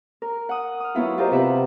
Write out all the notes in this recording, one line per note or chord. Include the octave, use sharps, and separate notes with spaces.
A#4
F#5 D#6
D#6 F6
F#3 B3 E4 F4
F4 G4 A#4 C5 D#5
C3 G4 B4 E5 F#5